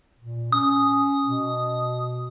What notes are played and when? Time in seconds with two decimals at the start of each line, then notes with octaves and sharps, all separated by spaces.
0.19 A#2
0.52 C#4 D#6
1.26 B2